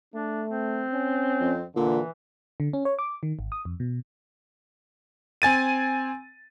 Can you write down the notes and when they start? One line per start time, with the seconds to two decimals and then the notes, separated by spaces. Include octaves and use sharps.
0.14 A3 D4
0.49 C4
0.93 C#4
1.40 F2
1.76 A#2 D3 E3
2.60 D3
2.73 C#4
2.85 C#5
2.99 D6
3.23 D#3
3.39 G#1
3.52 D#6
3.65 F2
3.80 B2
5.42 C4 G#5 A6 D#7